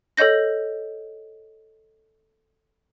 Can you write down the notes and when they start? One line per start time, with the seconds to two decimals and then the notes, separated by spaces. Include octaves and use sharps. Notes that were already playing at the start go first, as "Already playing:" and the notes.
0.17 A4 C#5 D#5 G6 A#6